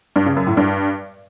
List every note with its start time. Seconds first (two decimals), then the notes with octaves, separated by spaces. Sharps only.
0.16 G2
0.26 C#3
0.36 F#2
0.47 A2
0.57 G2